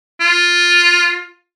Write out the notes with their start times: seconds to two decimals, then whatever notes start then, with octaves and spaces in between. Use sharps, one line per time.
0.20 F4